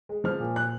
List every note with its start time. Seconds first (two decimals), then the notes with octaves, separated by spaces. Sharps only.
0.09 G#3
0.24 F3 F6
0.40 A#2
0.56 F#6